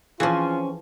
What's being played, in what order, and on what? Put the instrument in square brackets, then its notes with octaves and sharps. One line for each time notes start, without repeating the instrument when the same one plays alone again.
[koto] E3 F3 [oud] C4 C#4 G#4 [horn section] F4